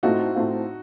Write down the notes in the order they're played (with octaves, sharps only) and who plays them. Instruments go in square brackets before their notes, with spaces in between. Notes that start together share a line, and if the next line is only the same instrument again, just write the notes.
[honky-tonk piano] A2 A3 C4 F4 [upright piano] D#4 F#4
[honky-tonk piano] A2 A3 C4 F4